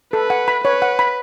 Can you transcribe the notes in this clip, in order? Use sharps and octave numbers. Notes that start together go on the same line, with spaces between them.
A4 B4
F#5
B5
B4 C#5
F#5
B5